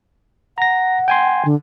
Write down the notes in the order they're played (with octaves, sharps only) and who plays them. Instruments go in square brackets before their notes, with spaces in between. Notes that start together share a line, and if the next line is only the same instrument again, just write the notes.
[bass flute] F#5 [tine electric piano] A#5 A#6
[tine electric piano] G5 G#5 C6
[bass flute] D3